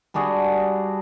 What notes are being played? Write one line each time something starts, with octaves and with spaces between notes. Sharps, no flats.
G3 D4 F#4 G#4